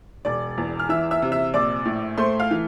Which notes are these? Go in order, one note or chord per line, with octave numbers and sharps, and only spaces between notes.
E1 D5 D6
E2
F6
E3 E5 E6
E5 E6
C3
E5 E6
A#1 D5 D6
A2
A3 C5 C6
F5 F6
E3